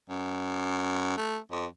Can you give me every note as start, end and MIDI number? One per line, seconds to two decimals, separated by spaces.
0.09 1.16 42
1.17 1.38 57
1.51 1.66 41